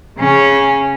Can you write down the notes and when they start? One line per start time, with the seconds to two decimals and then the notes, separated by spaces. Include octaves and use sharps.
0.19 C#3 C#4